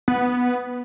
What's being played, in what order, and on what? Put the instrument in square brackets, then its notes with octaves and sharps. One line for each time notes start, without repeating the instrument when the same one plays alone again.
[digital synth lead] B3